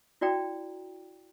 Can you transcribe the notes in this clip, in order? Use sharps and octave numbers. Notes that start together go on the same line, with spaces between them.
E4 F#4 D5 G5 A#5